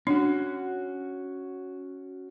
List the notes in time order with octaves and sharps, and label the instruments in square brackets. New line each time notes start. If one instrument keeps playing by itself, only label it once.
[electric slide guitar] C#4 F#4 [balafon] D4